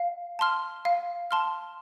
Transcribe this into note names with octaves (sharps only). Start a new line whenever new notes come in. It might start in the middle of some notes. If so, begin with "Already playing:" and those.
Already playing: F5
A5 C6 F6
F5
A5 C6 F6